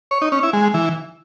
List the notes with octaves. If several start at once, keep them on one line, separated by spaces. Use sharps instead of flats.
C#5
D#4
C#4
E4
G#3
E3